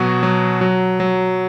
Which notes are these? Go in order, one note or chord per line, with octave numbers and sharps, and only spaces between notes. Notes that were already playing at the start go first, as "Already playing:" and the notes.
Already playing: B2 F#3 F#4
F#3
F#3
F#3